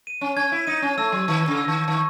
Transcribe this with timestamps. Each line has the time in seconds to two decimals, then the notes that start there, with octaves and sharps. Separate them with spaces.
0.07 D#7
0.21 C#4
0.36 C#4 G#6
0.52 E4
0.67 D#4 D#7
0.82 C#4
0.98 A3 E6
1.12 F#3
1.28 D#3 E6
1.48 C#3
1.57 E6
1.68 D#3
1.88 D#3 E6